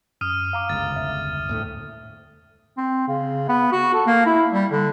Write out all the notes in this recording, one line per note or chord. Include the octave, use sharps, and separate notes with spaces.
F#2 D#6 F6 D#7
F5 A#5 D6
G1 C#2 A6
E2 E5
D2 A2 A3
C4
C#3
B3
F#4
A4
A#3
E4
G3
D3